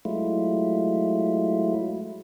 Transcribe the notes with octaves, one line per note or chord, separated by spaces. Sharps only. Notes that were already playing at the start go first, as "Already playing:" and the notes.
F#3 G#3 A3 E4 F4